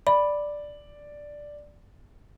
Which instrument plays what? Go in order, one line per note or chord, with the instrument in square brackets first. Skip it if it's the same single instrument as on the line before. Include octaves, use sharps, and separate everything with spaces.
[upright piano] D5 [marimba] B5